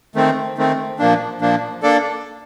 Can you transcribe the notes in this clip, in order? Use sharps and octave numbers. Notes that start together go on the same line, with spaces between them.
D#3 A3 C4
D#3 A3 C4
A#2 F3 A#3 D4
A#2 F3 A#3 D4
A#3 D4 A4 D5